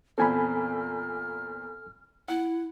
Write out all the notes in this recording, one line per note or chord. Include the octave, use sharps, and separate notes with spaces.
E2 A#2 C4 A4 G#5 B5 F6
E4 F#5